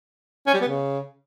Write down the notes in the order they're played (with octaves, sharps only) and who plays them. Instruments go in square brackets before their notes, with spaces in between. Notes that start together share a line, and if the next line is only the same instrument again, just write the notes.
[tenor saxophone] C#4
G3
B3
C#3